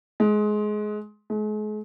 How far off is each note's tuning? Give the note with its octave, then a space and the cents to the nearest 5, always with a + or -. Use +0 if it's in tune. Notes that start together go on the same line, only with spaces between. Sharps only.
G#3 +20
G#3 +40